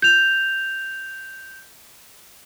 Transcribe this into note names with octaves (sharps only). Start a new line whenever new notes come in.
G6 F7